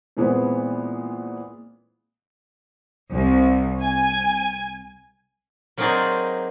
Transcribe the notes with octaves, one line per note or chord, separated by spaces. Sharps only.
A#2 E3 G#3 B3 C4
C2
G#5
F#3 A#3 C4 D#4 G#4 D5